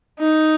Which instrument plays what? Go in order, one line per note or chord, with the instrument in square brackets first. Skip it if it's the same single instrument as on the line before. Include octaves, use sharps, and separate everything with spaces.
[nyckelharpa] D#4